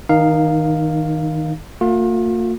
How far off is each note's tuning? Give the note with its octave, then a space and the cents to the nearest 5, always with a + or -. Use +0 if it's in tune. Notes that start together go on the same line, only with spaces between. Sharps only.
D#3 +20 D#4 -20 F5 +0
A#3 -45 F4 +40